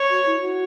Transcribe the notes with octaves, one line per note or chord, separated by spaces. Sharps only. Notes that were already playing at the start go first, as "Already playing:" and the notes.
Already playing: C#5
F#4
E4
F#4